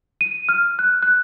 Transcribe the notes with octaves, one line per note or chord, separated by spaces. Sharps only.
D#7
F6
F#6
F#6